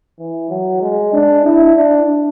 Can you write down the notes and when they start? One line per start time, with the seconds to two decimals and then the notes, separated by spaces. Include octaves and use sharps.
0.19 E3
0.50 F#3
0.82 G#3
1.13 D4
1.45 E4
1.76 D4